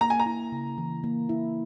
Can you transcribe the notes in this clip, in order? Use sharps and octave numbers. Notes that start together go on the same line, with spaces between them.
A#3 A#5
G#5
A#5
E4
C#3
E3
A#3
E4